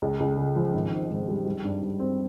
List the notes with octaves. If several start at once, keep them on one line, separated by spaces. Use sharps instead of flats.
C#2
C#2
C#3
F3
G#1
G#2
G#1
G3
G3
G2
G2
C4